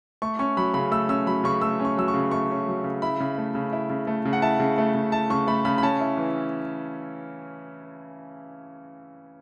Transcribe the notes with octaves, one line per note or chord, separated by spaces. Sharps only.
A3 C#6
C#4 C#6
F#3 B5
C#3 B5
A3 E6
C#4 E6
F#3 B5
C#3 C#6
A3 E6
C#4
C#6
F#3 E6
C#6
C#3
A3 C#6
C#4
F#3
C#3
E4 B5
C#3
A3
C#3
E4
C#3
A3
C#3
F#5
E4 A5
C#3
A3
C#3
E4 A5
C#3 C#6
A3 B5
C#3 B5
B5
C#4 A5
E4
E3